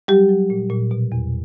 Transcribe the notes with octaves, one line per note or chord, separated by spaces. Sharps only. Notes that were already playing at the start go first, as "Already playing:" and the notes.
F#3 G3 G4
F#3
A#2
A#2
B2
E2